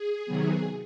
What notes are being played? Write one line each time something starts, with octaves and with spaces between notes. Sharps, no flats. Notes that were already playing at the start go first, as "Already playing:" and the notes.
Already playing: G#4
C3 D#3 F#3 B3